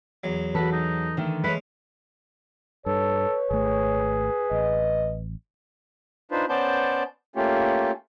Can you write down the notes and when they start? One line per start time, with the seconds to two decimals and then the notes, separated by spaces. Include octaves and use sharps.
0.24 E2 F#3
0.55 E3 F#4 A4 B4
0.72 D#4
1.17 D3 D#3 A3
1.44 G#3 A3 C#4 B4
2.86 G2 A4 B4 C#5
3.51 G#1 A3 G#4
4.51 A1 D#5
6.31 D4 D#4 F4 B4 C5
6.49 B3 C#4 C5 D5 A5 G6
7.36 A3 A#3 C#4 F4 G4